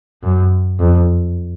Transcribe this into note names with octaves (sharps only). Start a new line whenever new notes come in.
F#2
F2